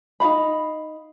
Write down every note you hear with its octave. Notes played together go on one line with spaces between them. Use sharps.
D#4 F#4 F5 B5